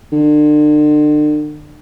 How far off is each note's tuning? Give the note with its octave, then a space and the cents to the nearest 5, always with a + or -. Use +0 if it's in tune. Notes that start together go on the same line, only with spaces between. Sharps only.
D3 +40